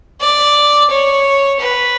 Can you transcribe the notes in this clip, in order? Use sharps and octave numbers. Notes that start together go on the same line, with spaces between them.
D5
C#5
B4